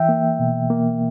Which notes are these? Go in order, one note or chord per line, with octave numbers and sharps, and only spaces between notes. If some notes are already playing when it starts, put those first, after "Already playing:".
Already playing: E3 E5 G5
A#3
B2
A#3